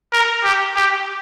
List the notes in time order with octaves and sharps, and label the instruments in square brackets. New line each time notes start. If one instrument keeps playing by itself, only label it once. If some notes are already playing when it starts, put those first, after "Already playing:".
[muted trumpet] A#4
G4
G4